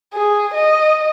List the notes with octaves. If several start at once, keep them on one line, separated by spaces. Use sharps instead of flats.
G#4
D#5